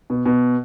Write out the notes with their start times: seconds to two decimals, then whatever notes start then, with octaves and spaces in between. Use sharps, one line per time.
0.10 B2
0.26 B2